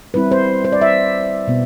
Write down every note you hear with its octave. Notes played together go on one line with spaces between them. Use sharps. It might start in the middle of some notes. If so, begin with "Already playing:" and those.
G3 C4 E4 B4
C5
C5
D5
E5
B2 B3